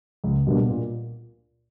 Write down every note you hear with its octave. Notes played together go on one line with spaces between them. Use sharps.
C#2
B2 G3 A#3 D4
A#2